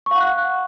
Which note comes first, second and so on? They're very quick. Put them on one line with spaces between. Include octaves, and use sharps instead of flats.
C#6 F5 F#5 F#6